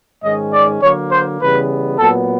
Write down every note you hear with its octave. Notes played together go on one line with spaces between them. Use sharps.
G#2 D#3 G#3 C#4 D#5
D5
D3 F#3 A#3 C#5
C5
C#3 E3 G3 B3 B4
A#2 F#3 B3 A4